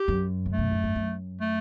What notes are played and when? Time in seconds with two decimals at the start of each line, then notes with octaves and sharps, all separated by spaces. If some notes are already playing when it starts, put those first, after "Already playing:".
Already playing: G4
0.08 F#2
0.46 C#3
0.53 A3
0.58 B2
0.71 A2
0.84 G2
0.96 F#2
1.41 A3